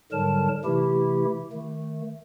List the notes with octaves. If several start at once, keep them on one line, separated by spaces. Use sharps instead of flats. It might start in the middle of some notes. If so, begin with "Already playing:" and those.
G#2 D3 F#3 G3 A#4 A5
C3 E3 A3 E4 G4
D#3 A3